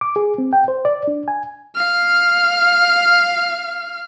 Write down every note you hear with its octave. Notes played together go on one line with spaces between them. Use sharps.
D6
G#4
C4
G5
C5
D5
D4
G#5
F5 F6